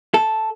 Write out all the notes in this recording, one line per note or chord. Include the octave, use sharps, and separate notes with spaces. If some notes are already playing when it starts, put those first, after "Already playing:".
A4